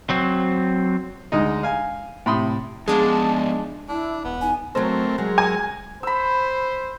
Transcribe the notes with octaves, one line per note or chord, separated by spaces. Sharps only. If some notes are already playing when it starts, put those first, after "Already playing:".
F#3 C4
D2 G#3 D#4
F5 G#5
A2 C3 B5 C6 D#6
F3 G#3 B3 D4 F5 A5
D4 E4
E1 B3
D#4 G#5
F#3 A3 C4 A#4 C5
F#3 G#3 A#4
G#5
C5 B5 E6